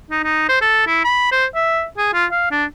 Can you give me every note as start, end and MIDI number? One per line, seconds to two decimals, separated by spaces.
0.11 0.23 63
0.24 0.45 63
0.49 0.60 72
0.61 0.87 69
0.87 1.01 64
1.04 1.28 83
1.32 1.46 72
1.55 1.85 76
1.98 2.10 68
2.13 2.26 65
2.31 2.50 77
2.51 2.65 62